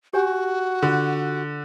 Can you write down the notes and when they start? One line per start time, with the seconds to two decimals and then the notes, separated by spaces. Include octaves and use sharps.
0.13 F#4 G4 C#5 G#5
0.82 D3 F4